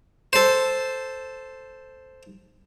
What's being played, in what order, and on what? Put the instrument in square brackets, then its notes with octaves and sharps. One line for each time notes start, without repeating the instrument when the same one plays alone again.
[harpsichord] A4 C5